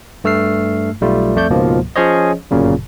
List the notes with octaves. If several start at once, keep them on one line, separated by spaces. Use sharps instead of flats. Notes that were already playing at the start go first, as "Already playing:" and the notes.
G2 A3 E6 F6 C7
B1 G3 A3 F4
F2 A3 D5 G6
C#2 G#2 B2 F3 A#3
F3 C#4 G#4 C5 C#5 D#5
G1 F#2 A#2 C#3 F#3